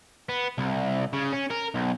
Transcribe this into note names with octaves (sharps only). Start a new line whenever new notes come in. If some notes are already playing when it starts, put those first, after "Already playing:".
B3
C2
C#3
C#4
A#4
B1